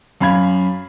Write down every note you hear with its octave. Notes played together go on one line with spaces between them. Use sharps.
F#2 F5 B5 G#6